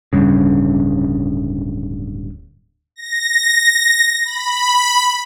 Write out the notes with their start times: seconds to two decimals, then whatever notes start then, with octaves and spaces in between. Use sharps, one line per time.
0.13 D1 G2 C#3
2.96 A#6
4.25 B5